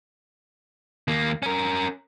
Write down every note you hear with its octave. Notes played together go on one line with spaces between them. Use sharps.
D#2 A#3
C#4 A#4